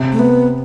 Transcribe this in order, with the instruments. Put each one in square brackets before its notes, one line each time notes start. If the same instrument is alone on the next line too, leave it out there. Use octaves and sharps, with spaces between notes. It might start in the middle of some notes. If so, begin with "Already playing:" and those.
Already playing: [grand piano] C3
[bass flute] A3
B3